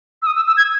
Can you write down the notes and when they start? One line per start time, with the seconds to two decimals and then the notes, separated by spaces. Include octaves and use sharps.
0.22 E6
0.27 D#6
0.36 E6
0.47 E6
0.57 G#6